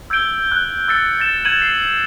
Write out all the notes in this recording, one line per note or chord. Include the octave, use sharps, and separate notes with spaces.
E6 G6 G#6 D7 G7
F#6
E6 A6 C#7
A6 E7
G#6 C#7 D#7 F#7
C7